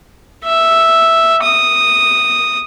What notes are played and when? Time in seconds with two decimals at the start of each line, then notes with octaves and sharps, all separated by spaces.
0.45 E5
1.43 D#6